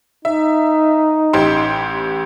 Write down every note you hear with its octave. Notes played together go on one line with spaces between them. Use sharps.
D#4 E5
A1 G4 C6